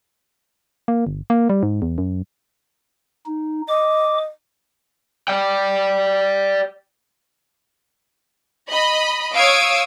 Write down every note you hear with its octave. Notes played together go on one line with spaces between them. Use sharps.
A#3
G1
A#3
G3
G#2
E2
F#2
D#4
D#5 D6
D5 G5
D#5 B5
C#5 F5 D#6 E6 G#6 D7